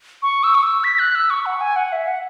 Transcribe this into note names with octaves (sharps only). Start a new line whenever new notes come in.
C#6
E6
C#6
E6
B6
F#6
E6
C#6
F#5
G#5
F#5
E5
F#5